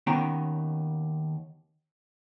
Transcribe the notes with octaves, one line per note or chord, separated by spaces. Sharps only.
D#2 D#3 B3 C#4 G5 A#5